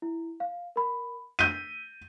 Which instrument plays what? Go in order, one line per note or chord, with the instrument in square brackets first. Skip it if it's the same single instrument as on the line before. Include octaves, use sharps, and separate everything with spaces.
[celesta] E4
F5
A#4 B5
[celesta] E6 B6 [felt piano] G6 D#7